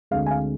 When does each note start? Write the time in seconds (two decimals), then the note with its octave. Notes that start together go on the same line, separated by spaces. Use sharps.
0.11 D2 D3 G#3 C4 F5
0.26 G#5
0.31 F5